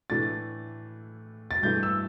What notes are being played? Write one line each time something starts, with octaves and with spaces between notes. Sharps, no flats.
A2 E3 A3 D4 A6
A6
G2 E3 A3 G6
E6